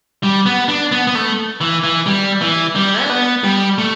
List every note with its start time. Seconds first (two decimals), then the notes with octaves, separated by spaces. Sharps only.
0.23 G3
0.46 B3
0.68 D4
0.92 B3
1.07 B3
1.15 A3
1.61 E3
1.83 E3
2.07 G3
2.42 E3
2.75 G3
3.02 D4
3.10 B3
3.44 G3
3.78 A3